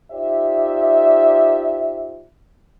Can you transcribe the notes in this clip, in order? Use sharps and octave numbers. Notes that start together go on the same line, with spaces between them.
D#4 F4 G4 C5 D5 E5